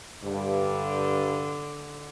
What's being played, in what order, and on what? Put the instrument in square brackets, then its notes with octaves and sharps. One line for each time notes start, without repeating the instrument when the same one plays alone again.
[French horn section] G2 [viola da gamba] D3